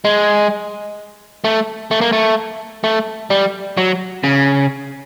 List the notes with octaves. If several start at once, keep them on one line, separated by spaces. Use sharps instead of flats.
G#3
A3
A3
A#3
A3
A3
G3
F#3
C#3